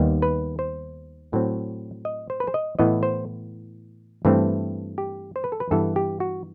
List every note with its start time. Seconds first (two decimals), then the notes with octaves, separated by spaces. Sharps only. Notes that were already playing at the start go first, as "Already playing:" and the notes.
Already playing: D#2 D#3 G3 B3
0.22 B4
0.59 C5
1.33 A2 F#3 C4
2.05 D#5
2.30 C5
2.40 B4
2.47 C5
2.54 D#5
2.79 A2 E3 B3 D#5
3.03 C5
4.25 G2 E3 A3 C4
4.98 G4
5.36 C5
5.44 B4
5.52 A4
5.60 B4
5.71 G2 E3 B3 A4
5.96 G4
6.20 F#4